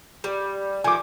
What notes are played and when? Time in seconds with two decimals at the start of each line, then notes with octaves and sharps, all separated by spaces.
0.24 G3
0.84 D#3 F3 A3 G#5 D6